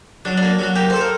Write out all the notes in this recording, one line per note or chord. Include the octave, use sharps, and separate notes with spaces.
F#3 D4
A#3 D4
F#3 F#4
A#3 G4
A4 C5
A#4